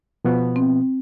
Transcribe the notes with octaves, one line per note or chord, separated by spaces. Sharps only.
B2 F3 B3
C4